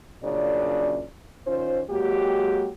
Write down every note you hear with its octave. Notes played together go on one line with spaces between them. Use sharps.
F#2 A#2 C#3 D4 D5
D#3 C#4 F4 C5
F#3 G#3 A#3 F#4 G4